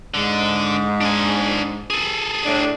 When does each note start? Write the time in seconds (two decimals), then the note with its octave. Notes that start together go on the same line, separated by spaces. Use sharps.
0.14 G#2 D3
1.01 D4 G#5
1.90 G#4 A4
2.46 A2 D4